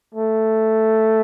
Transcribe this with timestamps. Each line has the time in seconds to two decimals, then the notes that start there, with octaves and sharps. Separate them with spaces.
0.15 A3